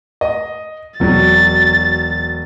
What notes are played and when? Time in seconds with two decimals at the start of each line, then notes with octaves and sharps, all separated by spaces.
0.21 D#5
1.00 E1 F#3 A6